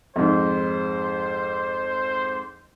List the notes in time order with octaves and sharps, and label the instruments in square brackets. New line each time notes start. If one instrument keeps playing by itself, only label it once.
[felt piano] F2 G#2 [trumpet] C5